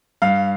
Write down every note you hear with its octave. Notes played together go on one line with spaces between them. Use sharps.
G2 F5